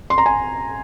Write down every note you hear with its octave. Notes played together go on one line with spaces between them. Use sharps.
C6
A#5
G#5